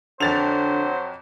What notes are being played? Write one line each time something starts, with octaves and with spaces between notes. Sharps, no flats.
F2 D3 F#3 C5 A6 F7